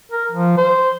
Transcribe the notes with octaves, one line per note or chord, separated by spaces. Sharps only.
A#4
F3
C5